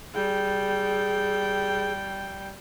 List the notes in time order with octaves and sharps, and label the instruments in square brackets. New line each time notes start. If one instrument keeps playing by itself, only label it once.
[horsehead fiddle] G3 G5 [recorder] G#4